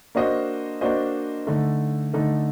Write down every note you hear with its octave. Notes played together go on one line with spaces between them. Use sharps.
A#3 D4 F#4 C5 D#5
A#3 D4 F#4 C5 D#5
D3 A3 D#4
D3 A3 D#4